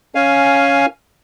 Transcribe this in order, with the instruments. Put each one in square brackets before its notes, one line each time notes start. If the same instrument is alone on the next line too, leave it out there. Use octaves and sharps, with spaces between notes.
[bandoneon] C#4 F5 G#5